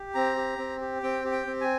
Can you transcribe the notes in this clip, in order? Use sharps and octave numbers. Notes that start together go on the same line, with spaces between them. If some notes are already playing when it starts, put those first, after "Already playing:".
Already playing: G4
C4 A#5
G4
C4
G4
C4 G5
G4
G5
C4
G#5